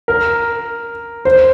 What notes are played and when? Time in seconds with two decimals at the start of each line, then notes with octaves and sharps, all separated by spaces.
0.08 A#4
1.25 C5